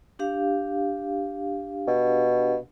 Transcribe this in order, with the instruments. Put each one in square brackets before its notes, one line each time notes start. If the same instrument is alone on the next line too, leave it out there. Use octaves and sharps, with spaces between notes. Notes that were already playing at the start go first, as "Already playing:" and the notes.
[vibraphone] D4 G4 F5
[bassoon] B2